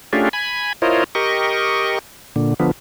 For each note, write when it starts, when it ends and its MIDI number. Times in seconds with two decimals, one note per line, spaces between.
0.13 0.29 57
0.13 0.29 61
0.13 0.29 62
0.13 0.29 65
0.13 0.29 67
0.13 0.29 68
0.33 0.73 80
0.33 0.73 83
0.82 1.04 64
0.82 1.04 65
0.82 1.04 70
0.82 1.04 72
0.82 1.04 73
0.82 1.04 75
1.15 1.99 67
1.15 1.99 70
1.15 1.99 75
1.15 1.99 85
2.36 2.54 46
2.36 2.54 50
2.60 2.71 50
2.60 2.71 53
2.60 2.71 59